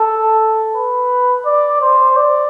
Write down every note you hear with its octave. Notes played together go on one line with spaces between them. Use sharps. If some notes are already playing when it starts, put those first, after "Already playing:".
Already playing: A4
B4
D5
C5
D5